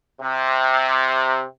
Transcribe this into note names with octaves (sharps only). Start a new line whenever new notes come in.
C3